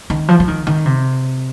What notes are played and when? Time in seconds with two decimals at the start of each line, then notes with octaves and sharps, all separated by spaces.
0.10 D#3
0.28 F3
0.40 F3
0.48 D#3
0.67 D#3
0.86 C3